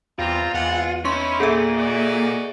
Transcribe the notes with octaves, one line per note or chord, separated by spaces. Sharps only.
E2 G3 C4 F4 A#5
E2 G#3 C4 F#5
C#4 D#4 E4 C6 C#6
A#2 G#4 A4 E5
F#4 D5 D#5